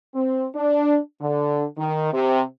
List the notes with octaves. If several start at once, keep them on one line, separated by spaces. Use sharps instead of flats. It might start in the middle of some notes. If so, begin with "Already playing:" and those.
C4
D4
D3
D#3
C3